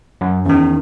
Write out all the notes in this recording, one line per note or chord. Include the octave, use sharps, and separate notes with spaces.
F#2
E2 D#3 C#4